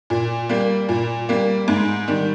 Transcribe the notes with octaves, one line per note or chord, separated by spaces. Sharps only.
A#2
G3 A#3
A#2
G3 A#3
G#2
D#3 G3